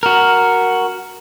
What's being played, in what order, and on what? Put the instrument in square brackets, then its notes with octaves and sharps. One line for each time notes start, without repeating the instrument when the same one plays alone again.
[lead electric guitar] F#4 A#4